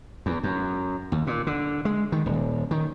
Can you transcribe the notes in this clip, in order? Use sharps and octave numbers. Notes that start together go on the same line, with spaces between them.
E2
F#2
D#2
A#2
D3
G#3
D#3
D#1
D#3